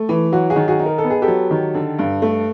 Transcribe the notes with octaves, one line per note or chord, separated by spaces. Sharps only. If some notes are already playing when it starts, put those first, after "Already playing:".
Already playing: A3
E3
F#3 F#4
F#4 G#4
D#3
F#4 G#4
D#4
A#4
A4
B3
G#4
G4 A4
F#3
D#3
D3
G2
A3